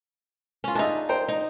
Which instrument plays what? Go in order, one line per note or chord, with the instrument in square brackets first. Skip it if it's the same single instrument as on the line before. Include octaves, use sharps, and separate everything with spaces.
[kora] C#4 F4
[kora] D4 D#4 [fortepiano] G#4 D#5 E5
[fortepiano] C5 G5 A#5
[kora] D#4